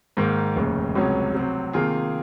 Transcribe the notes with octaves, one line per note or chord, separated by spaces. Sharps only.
G#2 D#3 A#3
F1 D#2 C#3
C#2 C3 F#3 C#4 G#4
C3 F#3 C4
C3 D#3 A#3 F4 G#4